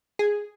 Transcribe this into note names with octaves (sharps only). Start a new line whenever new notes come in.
G#4